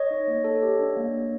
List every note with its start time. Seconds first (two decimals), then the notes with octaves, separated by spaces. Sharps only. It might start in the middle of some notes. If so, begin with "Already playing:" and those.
Already playing: C#5 D#5
0.11 D#4
0.27 A#3
0.44 A4
0.62 G4
0.79 D4
0.97 A#3
1.13 A#3